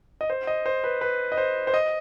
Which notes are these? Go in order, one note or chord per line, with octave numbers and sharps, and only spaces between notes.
D#5
C5
D#5
C5
B4
B4
D#5
C5
C5
D#5